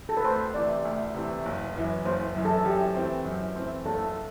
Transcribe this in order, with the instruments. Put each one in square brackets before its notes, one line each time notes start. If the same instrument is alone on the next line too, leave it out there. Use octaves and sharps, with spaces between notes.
[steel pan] A4
B4
[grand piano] D2 [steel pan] C5
[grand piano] C3 E3 A3 [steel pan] D5
[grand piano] D2
C3 E3 A3
F#1
F#2 E3
[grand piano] F#1 [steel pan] C5
[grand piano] F#2 E3
[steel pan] A4
[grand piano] F#2 [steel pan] G4
[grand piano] E3 A3 C4
F#2
E3 A3 C4
[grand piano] F#1 [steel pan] A4